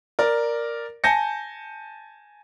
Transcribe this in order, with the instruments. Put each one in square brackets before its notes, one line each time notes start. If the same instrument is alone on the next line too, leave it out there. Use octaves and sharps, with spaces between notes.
[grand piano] A#4 D5
G#5 A5 G6 A#6 C#7